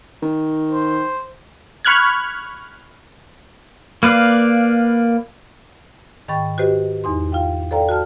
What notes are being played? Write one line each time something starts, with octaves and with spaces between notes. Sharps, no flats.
D#3
C5
B5 C#6 F6 F#6 G#6
A#3 B4 D5 F5
G#2 D#3 G5 B5 C#6 A6
F#4 G4 B4 C5 D#5
E2 D#4 C6
F4 F5 G5
A4 C5 D5 F5 G5 A#5
F#4 A5 F6